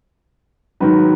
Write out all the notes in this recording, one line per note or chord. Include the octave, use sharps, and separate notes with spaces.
G#2 D#3 F#3 B4